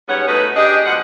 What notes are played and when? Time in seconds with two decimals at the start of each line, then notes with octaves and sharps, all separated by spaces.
0.08 G#2 G3 B3 C#4 C#5 F#5
0.26 B2 A3 C#4 D#4 B4
0.56 D4 G4 G#4 D#5
0.85 B2 F3 G#3 F#5